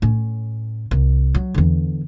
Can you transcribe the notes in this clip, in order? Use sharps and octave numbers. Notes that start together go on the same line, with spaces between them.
A2 C#4
C2
F#3
E2 D3